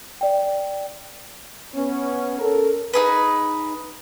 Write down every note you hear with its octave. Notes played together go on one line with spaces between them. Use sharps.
D5 G5
B3 C#4
C#4 A4 A#4
D#4 G#4 B4